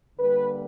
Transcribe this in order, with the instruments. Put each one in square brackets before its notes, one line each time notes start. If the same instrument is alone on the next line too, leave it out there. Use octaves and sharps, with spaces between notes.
[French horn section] D3 G3 A#3 B4